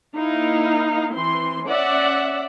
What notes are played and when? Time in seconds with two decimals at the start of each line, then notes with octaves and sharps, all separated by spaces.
0.16 A#3 D#4 E4 F5
1.13 E3 C4 C6
1.66 C#4 D5 E5 F#5